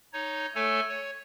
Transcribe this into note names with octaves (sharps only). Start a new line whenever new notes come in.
D#4 C#5
A3 A4 C#5 G#5
C#5